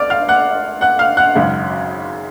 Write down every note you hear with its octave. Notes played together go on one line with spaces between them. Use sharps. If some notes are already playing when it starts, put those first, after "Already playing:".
Already playing: C#2 D5 D6 F6
F5 F6
F#5 F#6
F#5 F#6
F5 F6
F#5 F#6
G#1 F#2 C#3 G#3